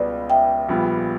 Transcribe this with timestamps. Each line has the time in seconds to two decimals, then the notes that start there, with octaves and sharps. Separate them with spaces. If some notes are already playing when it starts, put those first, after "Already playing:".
Already playing: C#2 B2 G3 B3 B4 D5
0.30 E5 G5
0.69 A#1 A#2 G3 B3